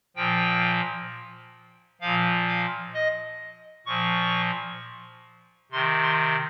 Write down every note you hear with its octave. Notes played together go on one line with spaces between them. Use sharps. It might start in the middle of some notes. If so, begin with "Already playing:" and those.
A#2 F3 G5
A#2 F3 F5
F5
D#5
A#2 F3 C#6
C3 D#3 C6
C6